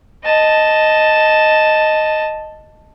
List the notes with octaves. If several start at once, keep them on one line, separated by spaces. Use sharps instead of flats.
D#5 A5